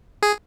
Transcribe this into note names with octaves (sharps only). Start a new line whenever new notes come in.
G#4